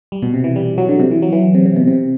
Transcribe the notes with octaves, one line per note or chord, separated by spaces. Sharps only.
G3
B2
C3
E3
G3
F#3
D3
C3
E3
F#3
E3
C3
C3
B2
C3